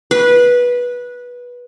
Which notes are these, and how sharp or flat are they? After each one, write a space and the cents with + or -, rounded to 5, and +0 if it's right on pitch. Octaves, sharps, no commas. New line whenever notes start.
B4 -15